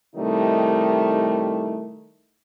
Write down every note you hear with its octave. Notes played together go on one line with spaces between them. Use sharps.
C3 D#3 G3 A3 D#4 E4